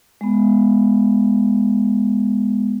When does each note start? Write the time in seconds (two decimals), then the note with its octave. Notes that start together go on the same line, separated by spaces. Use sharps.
0.21 G#3 B3